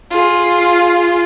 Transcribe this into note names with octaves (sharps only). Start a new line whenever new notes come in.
F4 G#4